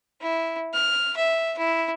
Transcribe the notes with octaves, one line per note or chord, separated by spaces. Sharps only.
E4
F6
E5
E4